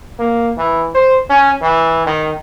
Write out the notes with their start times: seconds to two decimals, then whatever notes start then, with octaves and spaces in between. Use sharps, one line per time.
0.19 A#3
0.57 E3
0.95 C5
1.30 C#4
1.62 E3
2.06 D#3